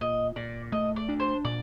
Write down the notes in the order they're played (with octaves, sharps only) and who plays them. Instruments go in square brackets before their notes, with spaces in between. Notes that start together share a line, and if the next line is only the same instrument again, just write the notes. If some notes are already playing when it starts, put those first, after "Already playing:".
[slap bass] A#2 [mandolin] D#5
[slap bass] A#2 [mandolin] D5
[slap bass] A3 [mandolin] D#5
[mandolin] D5
[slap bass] D4
[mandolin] C5
[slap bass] A#2 [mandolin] D5